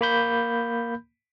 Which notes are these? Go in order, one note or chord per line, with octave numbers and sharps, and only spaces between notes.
A#3 B5 G6